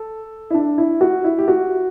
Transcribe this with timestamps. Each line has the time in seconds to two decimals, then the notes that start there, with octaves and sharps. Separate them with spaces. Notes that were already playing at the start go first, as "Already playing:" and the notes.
Already playing: A4
0.50 E4
0.54 D4
0.78 E4
1.01 F#4
1.24 E4
1.38 G4
1.48 F#4